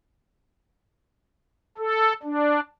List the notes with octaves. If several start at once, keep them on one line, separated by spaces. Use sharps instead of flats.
A4
D4